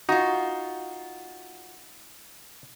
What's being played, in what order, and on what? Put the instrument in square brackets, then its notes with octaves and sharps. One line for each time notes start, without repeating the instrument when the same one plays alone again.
[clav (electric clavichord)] D#4 [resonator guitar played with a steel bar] F4 F#4